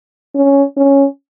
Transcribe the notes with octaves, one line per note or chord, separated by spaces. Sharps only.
C#4
C#4